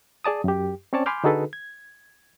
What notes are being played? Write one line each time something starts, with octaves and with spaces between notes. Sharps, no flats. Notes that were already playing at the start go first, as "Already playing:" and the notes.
G#4 D5 A5 D#6
F#2 G4
C4 C#4 C#5 D5 A5
G#5 B5 C6 D6 F6 G6
D3 D#4 F#4 G#4 A4 B4
G#6